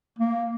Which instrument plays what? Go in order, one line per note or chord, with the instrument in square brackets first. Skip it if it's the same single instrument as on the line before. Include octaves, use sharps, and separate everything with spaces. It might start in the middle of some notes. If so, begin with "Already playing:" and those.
[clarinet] A#3